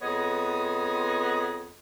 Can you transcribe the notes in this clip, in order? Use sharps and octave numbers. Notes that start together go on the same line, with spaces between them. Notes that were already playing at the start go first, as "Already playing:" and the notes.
F2 B3 G#4 C#5 D#5